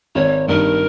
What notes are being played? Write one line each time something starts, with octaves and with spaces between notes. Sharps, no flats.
G#1 C#5
G2 D#3 A#4